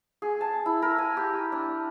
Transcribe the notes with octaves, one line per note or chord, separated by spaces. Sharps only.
G#4
A5
E4
A#4
G#5
G4
D4